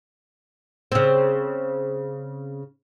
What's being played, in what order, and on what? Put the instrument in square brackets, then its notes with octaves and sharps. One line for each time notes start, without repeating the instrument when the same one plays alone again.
[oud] C#3 C4